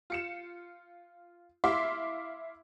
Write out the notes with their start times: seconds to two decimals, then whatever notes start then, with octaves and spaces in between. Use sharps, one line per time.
0.10 F4 C#7 E7
1.64 E4 E5 F5 C6 D6